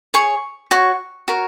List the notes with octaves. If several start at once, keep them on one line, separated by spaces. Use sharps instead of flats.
G#4 C#5 C#6
F#4 C#5 C#6
F#4 A#4 C#5